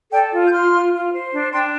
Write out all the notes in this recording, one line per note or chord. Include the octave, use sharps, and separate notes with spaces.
A4 D5 G5
F4
G6
F4 C6 F6
F4
F4
C5
D4
D4 G5 C6